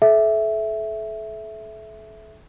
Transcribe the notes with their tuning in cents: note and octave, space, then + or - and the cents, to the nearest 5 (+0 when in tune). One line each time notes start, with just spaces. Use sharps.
A4 -35 E5 +0